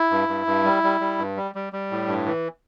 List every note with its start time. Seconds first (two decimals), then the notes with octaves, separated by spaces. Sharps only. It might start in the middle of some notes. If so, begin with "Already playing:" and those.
Already playing: E4
0.11 G2
0.29 G2
0.47 G2
0.64 G3
0.83 G3
1.01 G3
1.19 G2
1.37 G3
1.55 G3
1.73 G3
1.91 A2
2.08 G2
2.26 E3